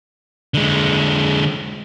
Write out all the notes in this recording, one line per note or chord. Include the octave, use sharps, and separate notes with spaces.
D3 G#3